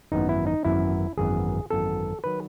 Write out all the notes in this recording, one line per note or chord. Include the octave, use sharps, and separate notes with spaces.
G#1 F#2 E3 B3 D#4
E4
D#4
G#1 F#2 E3 B3 E4
G#1 F#2 E3 B3 G#4
G#1 F#2 E3 B3 A4
D#3 F#3 B4